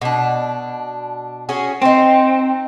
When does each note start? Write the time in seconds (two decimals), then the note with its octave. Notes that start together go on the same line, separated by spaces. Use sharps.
0.01 B2 D4
1.49 C#4 F#4 G#4
1.82 C4 D#4 C5